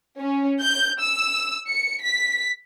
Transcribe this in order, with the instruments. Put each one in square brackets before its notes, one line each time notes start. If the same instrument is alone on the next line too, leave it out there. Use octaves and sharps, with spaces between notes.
[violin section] C#4
G6
E6
C#7
B6